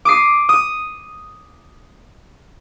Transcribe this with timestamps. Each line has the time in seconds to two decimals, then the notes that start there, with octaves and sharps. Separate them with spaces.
0.05 D6 D#6 C7
0.49 D#6